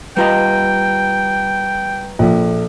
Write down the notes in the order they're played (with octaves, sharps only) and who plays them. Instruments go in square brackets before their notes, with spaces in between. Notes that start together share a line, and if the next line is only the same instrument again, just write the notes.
[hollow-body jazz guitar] G3 F4 D#5 [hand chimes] B4 A#5 [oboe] G5
[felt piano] A#1 [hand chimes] E4 A4